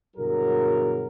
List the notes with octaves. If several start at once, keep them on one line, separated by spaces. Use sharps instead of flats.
G1 B2 F#3 E4 G#4 A#4